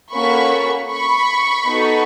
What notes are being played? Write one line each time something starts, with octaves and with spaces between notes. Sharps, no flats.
A#3 C#4 F#4 A4 B5 C#6
B5 C#6
B3 D#4 F#4 A4